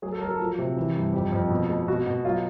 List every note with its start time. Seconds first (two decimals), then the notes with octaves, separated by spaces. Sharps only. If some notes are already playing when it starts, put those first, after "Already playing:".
0.02 F#3 G#4
0.12 A4
0.21 F#3 A#4
0.30 A4
0.40 F3
0.58 C3
0.77 E3
0.96 G2
1.13 F2 G4
1.32 F2
1.50 B2
1.69 G#3
1.88 B2 F#4
2.06 B2
2.25 F#3 F4